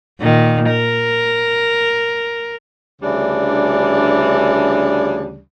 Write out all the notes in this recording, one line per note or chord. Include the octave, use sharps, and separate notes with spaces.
A#2 D#3
A#4
D2 C#3 E3 G3 D4